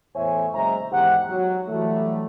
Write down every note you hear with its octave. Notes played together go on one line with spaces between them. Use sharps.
E2 A2 C5 C#5 E5 G#5
F#1 G#3 C5 E5 A#5
E2 G#2 D#3 G4 C5 F#5
F#3
E3 F#3 G3 A3